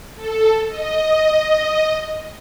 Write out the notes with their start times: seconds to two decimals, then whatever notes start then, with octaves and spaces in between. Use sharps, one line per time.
0.16 A4
0.67 D#5